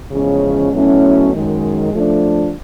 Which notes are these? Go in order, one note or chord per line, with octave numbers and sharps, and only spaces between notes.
E2 C#3 F3 G#3 C#4
B2 F#3 A3 C#4 E4
F#2 D#3 G#3
F3 A3 D4